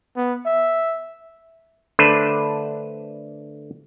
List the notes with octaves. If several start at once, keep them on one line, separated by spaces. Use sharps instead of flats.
B3
E5
D3 A3 D4 B4 C5 D5